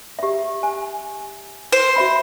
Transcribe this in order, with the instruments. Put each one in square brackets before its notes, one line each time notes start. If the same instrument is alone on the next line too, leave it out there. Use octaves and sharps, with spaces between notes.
[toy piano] G4 E5
G#5
[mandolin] C5
[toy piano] F#4 E5 B5